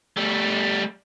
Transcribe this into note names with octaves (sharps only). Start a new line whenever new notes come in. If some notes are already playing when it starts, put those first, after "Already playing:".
G3 A3